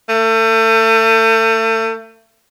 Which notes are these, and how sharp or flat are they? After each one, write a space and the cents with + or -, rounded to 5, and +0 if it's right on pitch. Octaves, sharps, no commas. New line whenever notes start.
A3 +35